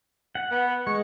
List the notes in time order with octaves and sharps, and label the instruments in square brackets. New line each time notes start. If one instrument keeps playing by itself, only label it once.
[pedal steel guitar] F#5
[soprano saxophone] B3
[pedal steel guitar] G#3 [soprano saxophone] C#6